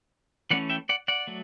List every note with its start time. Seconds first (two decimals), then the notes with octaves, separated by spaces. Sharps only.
0.51 E3 A3 C#4 D5 F#5
0.70 E5 G5
0.89 D5 F#5
1.08 D5 F#5
1.27 F#3 A3